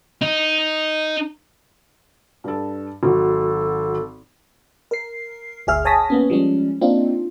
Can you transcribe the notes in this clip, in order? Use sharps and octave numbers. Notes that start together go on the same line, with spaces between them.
D#4
G2 A4
G#1 F#3 A4
A#4 C7
G1 D2 G#4 E5 F6
C#5 G#5 A5 D#6 A#6 B6
A#3 B3 C#4
F3 G3 G#3 C#4
A#3 C4 D4 D#4 F4